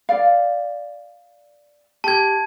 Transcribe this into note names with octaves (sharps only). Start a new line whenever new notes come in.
D5 F5
G4 A5 G#6